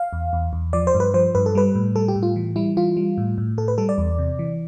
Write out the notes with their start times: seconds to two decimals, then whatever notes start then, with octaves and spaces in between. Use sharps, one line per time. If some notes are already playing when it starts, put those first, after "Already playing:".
Already playing: F5
0.13 E2
0.33 E2
0.53 E2
0.73 F3 D5
0.87 C5
0.94 G2
1.00 B4
1.14 F3 C5
1.35 G2 B4
1.46 A4
1.55 G3 B4
1.75 A2
1.95 G3 A4
2.08 G4
2.16 A2
2.23 F4
2.36 E3
2.56 G3 E4
2.77 E3 F4
2.97 G3
3.18 A2
3.38 A2
3.58 A2 A4
3.68 B4
3.78 G3 A4
3.89 D5
3.98 E2
4.18 C3
4.39 E3